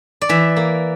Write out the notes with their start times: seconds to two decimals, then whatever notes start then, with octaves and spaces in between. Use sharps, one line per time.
0.21 D5
0.29 E3 E5
0.56 A#3